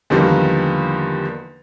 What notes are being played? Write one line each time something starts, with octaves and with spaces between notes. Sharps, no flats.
E2 D3 D#3 F3 G3 A#3